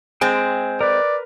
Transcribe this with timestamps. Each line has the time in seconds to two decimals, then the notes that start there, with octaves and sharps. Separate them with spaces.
0.21 G#3 C4 G5 G#5
0.81 A#4 B4 D5